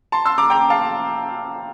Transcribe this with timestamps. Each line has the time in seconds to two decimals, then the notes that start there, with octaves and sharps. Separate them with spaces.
0.12 A5 C6
0.25 C6 E6
0.38 A#5 D6
0.50 G5 A#5
0.70 F5 A5